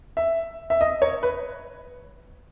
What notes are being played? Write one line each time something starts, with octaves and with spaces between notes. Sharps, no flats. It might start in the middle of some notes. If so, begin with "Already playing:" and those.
E5
E5
D#5
C#5
B4